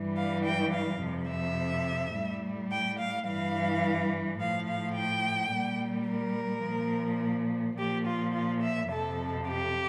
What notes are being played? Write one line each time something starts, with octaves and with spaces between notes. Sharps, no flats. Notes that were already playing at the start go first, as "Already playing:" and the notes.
Already playing: G2 E3 G3
F5
G5
F5
F2 C3 F3
E5
A2 G3
G5
F5
G2 E3 G3 F5
A2 F3 F5
F5
G5
A#2 G3
A#4
A#2 F3
A#2 F3 G4
F4
F4
E5
F2 C3 F3 A4
G4